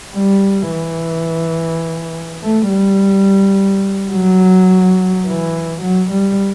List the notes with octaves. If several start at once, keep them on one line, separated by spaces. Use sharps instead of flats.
G3
E3
A3
G3
F#3
E3
F#3
G3